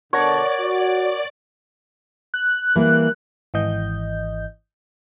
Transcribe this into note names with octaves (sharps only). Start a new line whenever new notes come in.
B2 D3 A#4 C#5 D5 F#5 A5 A#6
F#4
F#6
E3 G3 A#3
G#1 E3 D#5 G6